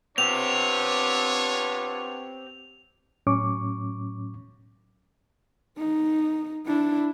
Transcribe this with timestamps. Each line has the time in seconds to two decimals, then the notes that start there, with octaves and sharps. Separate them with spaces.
0.18 B3 C4 D4 F4 G4 C#5 F7
3.27 A2 F#3 C#4 C#6 D6
5.78 D#4
6.66 D4 E4